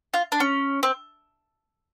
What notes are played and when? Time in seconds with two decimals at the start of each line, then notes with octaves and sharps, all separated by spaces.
0.14 F4
0.32 D4
0.40 C#4
0.83 C4